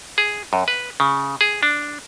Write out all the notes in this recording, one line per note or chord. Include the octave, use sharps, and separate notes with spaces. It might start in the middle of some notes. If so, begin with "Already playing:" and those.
G#4
F#2
B4
C#3
G#4
D4